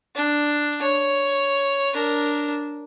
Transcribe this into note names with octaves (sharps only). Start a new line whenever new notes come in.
D4
C#5
D4 A#4